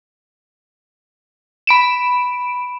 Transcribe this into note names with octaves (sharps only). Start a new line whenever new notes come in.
B5 D7 E7